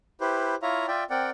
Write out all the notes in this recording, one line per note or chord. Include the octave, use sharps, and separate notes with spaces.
E4 G4 B4 C5
E4 F4 C#5 E5 F5 A#5
F4 D5 E5 G5
C4 A#4 D5 F#5 G5